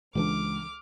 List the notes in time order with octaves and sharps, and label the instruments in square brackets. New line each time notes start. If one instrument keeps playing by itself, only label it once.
[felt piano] C#2 [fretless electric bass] C#3 E3 D4 [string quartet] D6 F6